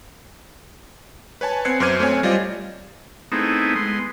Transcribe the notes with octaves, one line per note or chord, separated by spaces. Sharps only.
B4 C#5 G#5 A5
B3 C4 F#6 G#6 C7 C#7
F#2 C5 D6 F6 G#6 D#7
A3 C4 C#5 G#5
G3 F4 C5 D5 D#5
A3 B3 C4 D#4 E4 G#4
G#3 B3 C6